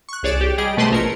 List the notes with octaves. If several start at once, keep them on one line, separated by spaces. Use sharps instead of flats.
C#6 F#6
C2 G#4 C#5 D5 A6 E7
G4
G3 G#4 D#5 D7
B2 A3 B4 C5 D#5 C6
A#1 A#4 C#7